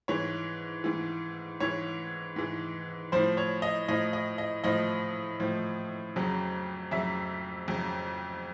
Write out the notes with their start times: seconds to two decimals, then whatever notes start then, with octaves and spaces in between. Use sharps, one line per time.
0.08 G#2 E3 C#5
0.84 G#2 E3
1.60 G#2 E3 C#5
2.36 G#2 E3
3.12 A2 F3 C5
3.37 C#5
3.62 D#5
3.88 A2 F3 D#5
4.13 D#5
4.38 D#5
4.64 A2 F3 D#5
5.40 A2 F3
6.16 F2 C#3 F#3
6.91 F2 C#3 F#3 E5
7.68 F2 C#3 F#3